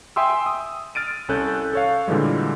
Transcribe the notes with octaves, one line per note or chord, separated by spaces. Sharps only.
E5 G5 G#5 C6 D#6 E6
D#6
F6 A6 D7 D#7
C2 C#4 A4 F#6 G6
A4 C#5 F5
A#2 D3 E3 G3 G#3